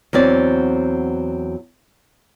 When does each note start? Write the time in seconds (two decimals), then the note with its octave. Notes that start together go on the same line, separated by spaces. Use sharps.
0.13 E2 F#3 C4 D5